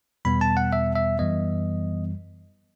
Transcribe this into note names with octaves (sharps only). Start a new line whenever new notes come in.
E2 B2 G3 B3 B5
A5
F#5
E5
E5
F#2 E3 G3 B3 D#5